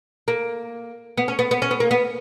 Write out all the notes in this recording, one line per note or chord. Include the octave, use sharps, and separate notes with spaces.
A#3
B3
C#4
B3
B3
C#4
B3
A#3
B3